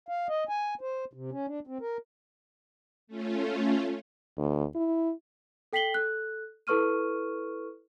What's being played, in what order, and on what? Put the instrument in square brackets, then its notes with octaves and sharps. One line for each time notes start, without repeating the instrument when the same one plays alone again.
[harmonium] F5
D#5
G#5
C5
C3
C#4
D4
C4
A#4
[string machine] A3 C#4 F4
[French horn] D2
E4
[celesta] A4 G5 B6 C7 F#7 G7
A4 F#6
E4 A4 B4 C#6 F6 D#7